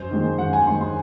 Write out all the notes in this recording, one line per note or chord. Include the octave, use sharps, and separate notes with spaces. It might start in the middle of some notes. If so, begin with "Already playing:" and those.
Already playing: F#2 C5
D#3 G#3
F#2 F#5
G#5
D#3 G#3 C6
C6